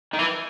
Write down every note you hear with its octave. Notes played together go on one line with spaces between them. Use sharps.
D#3
E3